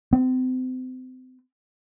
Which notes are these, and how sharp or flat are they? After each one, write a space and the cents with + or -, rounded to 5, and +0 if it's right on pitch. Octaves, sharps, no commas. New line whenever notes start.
C4 -35